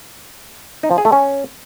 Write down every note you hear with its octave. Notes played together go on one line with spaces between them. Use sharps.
D#4
F3
G#4
A3
C#4